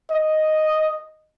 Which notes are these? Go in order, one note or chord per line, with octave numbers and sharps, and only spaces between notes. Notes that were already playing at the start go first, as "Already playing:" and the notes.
D#5